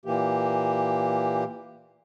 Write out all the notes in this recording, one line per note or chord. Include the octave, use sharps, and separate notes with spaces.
A#2 E3 A#3 G4